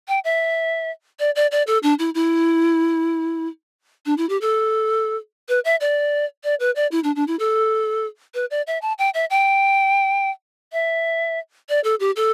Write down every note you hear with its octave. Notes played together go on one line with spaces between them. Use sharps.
G5
E5
D5
D5
D5
A4
D4
E4
E4
D4
E4
G4
A4
B4
E5
D5
D5
B4
D5
E4
D4
D4
E4
A4
B4
D5
E5
A5
G5
E5
G5
E5
D5
A4
G4
A4